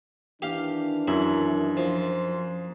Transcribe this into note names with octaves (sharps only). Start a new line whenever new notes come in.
D#3 E3 D4 G4 F5
F#2 E4
F3